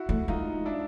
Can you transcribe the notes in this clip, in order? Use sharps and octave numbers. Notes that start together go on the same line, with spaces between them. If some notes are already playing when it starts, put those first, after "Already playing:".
Already playing: E4 F#4
A3
G#3 D#4 F4
D4 E4